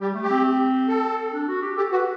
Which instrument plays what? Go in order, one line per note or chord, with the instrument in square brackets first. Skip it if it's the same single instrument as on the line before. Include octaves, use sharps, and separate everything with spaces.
[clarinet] G3 [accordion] G4
[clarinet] A3
[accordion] G4
[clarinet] C4
[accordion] A4
[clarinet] D4
F#4
G4
[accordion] G4 [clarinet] A4
[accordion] F#4 [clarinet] B4